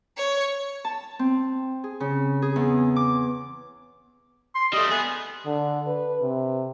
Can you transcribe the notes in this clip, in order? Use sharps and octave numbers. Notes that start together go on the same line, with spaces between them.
C#5
A5
C4
G#4
C#3
G#4
E2
D6
C6
G3 A3 D#5
B3 G#4
D3
B4
C3